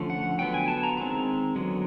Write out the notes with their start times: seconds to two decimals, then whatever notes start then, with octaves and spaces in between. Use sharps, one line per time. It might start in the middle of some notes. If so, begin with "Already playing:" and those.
Already playing: D3 F3 A3 C#4
0.10 F#5
0.38 D3 F#3 B3 G5
0.54 G#5
0.68 A5
0.83 A#5
0.97 D#3 G#3 C4 A#5
1.56 D3 F#3 B3